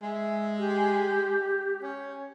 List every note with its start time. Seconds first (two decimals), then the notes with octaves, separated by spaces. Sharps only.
0.02 G#3 E5
0.59 G4
1.82 C#4 C#5